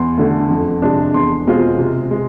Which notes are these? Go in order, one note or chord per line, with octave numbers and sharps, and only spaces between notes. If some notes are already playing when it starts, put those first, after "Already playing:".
Already playing: E2 C6
D3 A3
F2
C3 G#3 D4
E2 C6
B2 G#3 C4 F4
C3
G#3